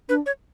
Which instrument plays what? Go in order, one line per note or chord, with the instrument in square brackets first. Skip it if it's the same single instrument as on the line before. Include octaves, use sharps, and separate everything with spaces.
[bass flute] D4 [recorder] B4
[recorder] C#5